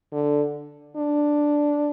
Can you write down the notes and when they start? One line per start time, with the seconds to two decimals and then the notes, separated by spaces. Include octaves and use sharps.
0.12 D3
0.97 D4